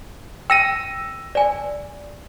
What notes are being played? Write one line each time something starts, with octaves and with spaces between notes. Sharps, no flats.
G5 E6 A#6 D#7
D5 G#5